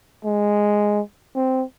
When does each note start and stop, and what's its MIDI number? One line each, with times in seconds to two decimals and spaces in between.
0.25 1.01 56
1.35 1.64 60